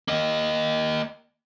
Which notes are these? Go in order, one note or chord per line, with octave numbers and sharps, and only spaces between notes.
A#3 D#5